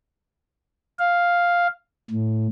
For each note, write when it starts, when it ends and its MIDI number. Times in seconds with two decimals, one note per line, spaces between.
0.99 1.68 77
2.11 2.47 45